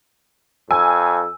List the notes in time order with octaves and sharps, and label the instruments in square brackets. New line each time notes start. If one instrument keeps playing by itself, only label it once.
[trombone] F2 [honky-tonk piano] G#5 [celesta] E6